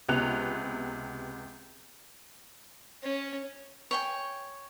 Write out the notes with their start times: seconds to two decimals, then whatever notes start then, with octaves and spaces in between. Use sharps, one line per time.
0.09 C#2 C3 B3 F#6 F7
3.03 C#4
3.91 C#5 G5 G#5